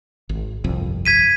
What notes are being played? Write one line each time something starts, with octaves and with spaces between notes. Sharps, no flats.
G#1
G1 C2 F2
G#6 B6 D#7